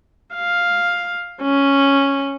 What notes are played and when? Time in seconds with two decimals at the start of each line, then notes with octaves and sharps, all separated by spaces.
0.35 F5
1.42 C#4